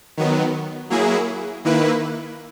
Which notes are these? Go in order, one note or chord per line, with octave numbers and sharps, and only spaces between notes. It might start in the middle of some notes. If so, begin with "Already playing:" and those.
D#3 F#3 B3
F#3 A#3 E4 G#4
D#3 A#3 E4 B4